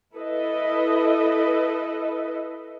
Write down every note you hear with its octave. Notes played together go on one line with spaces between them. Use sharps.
E4 A4 B4 D#5